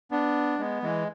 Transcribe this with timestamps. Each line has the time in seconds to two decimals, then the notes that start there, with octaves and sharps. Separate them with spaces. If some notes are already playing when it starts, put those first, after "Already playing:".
0.11 B3 D4
0.59 G#3 B3
0.83 E3 G#3